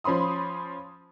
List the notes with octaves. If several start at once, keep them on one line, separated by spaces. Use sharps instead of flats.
F3 C#4 B5 C6 D#6